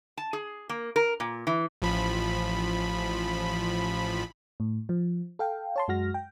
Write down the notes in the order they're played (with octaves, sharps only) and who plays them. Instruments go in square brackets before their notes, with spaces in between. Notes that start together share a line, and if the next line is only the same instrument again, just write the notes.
[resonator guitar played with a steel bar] A5
G#4
A#3
A#4
A#2
E3
[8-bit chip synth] A1 F3 B5
[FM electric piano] A2
F3
A4 F5 G5
C#5 A5 C6
F#2 G#3 F#4 F6 A#6
G5